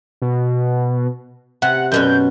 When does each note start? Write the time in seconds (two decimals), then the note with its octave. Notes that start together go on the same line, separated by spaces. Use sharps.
0.22 B2
1.62 C3 F#5
1.92 F#2 B2 C#4 G6